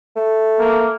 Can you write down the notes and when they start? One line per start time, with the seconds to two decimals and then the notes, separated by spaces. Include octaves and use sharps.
0.16 A3
0.59 A#3